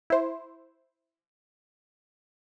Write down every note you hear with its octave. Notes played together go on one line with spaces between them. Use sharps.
E4 C5